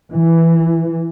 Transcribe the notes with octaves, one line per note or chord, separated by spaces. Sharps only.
E3